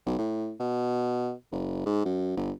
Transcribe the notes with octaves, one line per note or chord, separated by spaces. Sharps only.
B1
A2
B2
F#1
G#2
F#2
G1